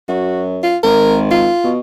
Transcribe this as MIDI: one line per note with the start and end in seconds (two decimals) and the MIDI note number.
0.09 0.74 42
0.09 0.47 66
0.63 0.78 65
0.83 1.50 32
0.83 1.19 70
1.31 1.71 65
1.64 1.79 47